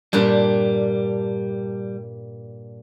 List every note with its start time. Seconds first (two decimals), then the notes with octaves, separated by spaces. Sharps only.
0.13 G2 A#2 G3 D4